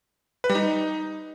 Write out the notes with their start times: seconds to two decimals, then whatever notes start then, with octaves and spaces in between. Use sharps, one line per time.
0.44 B4
0.50 G3
0.55 D#4